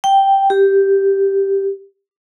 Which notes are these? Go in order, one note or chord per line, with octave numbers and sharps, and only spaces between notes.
G5
G4